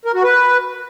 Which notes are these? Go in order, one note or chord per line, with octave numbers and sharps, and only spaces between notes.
A#4
F#4
B4